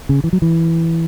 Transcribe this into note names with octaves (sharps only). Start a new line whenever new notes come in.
C#3
E3
F#3
E3